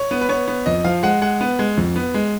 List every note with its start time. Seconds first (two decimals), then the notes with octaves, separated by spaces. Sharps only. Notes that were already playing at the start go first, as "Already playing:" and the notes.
Already playing: C#5
0.11 B3
0.21 B4
0.29 B3 C#5
0.48 B3
0.66 F2 D#5
0.84 F3 F5
1.03 G#3 F#5
1.22 G#3 F#5
1.41 B3
1.59 G#3
1.77 F2
1.96 B3
2.14 G#3